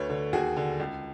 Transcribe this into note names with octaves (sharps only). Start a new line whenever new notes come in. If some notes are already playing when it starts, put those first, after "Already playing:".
Already playing: D2 B4 C#5
D3
D#2 F#4 G#4
D3
C#2